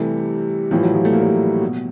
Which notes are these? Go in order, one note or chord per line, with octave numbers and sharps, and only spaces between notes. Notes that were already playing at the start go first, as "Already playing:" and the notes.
Already playing: C3 E3 G3 A3
A2 E3 F3 G3
F#3
F3 G3
A3
A#3
G3 A3
B2